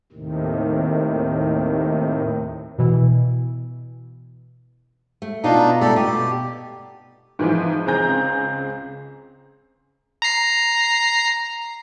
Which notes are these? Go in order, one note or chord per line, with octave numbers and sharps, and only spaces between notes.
D#2 A2 C3 D#3
B2 E3
A3
B2 B3 D4 D#4 F4
A3 G4 A4 D5
B2 G4
G#2 E3 F3
C#2 C4 G#4 A#5 G6
A#5 C7